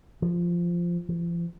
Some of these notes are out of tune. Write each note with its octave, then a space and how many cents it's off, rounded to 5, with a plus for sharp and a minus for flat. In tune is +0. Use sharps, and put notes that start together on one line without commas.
F3 -10
F3 -45